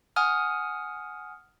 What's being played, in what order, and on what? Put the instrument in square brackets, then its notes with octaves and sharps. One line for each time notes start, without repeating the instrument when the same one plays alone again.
[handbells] F#5 G#5 D#6 F6